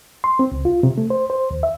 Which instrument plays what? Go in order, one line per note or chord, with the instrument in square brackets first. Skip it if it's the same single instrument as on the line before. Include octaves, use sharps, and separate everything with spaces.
[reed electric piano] C6
C4
C#2
F4
C3
A3
C5
C5
D#2
E5